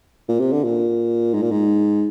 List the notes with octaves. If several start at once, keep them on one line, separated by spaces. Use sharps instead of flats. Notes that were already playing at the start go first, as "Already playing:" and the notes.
A#2
C3
D3
A#2
G#2
A#2
G#2